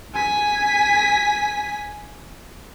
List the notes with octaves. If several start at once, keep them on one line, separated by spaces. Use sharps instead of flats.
G#5 B6